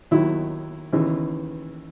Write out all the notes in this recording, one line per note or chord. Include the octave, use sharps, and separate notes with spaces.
D#2 D#3 F#3 E4
D#2 C#3 E3